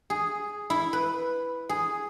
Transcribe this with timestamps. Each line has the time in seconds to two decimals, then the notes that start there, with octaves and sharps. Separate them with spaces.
0.10 G#4
0.70 E4
0.93 B4
1.69 G#4